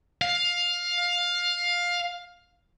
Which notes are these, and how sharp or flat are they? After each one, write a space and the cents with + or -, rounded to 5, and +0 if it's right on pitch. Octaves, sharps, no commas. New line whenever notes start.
F5 +15